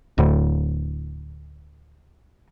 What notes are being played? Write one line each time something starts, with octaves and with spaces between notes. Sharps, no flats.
D1 D2